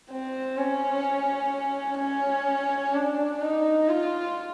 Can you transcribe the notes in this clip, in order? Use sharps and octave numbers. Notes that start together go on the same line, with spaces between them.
C4
C#4
C#4
D4
D#4
F4